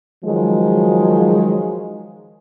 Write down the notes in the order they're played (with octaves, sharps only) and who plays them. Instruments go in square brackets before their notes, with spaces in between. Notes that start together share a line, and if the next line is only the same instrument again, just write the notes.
[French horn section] D#3 F3 F#3 G#3